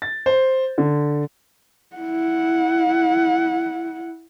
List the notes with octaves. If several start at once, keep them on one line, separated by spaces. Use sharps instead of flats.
A6
C5
D3
E4 F#5